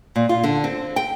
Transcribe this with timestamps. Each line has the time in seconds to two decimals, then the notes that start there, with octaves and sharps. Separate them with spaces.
0.16 A#2
0.29 F4
0.44 D3
0.64 C4
0.96 G5